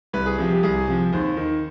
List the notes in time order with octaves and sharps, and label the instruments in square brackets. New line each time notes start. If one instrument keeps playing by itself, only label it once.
[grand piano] C2 B4
G#4
C3 F3 G#4
G4
C2 G#4
C3 F3
D#2 C5
D#3